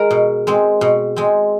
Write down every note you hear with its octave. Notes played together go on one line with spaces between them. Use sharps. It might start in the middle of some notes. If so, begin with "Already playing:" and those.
Already playing: G#3 G#4 A#4
B2
G#3 C4
B2
G#3 C4